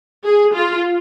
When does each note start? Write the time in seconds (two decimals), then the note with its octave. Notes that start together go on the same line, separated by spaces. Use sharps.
0.25 G#4
0.54 F4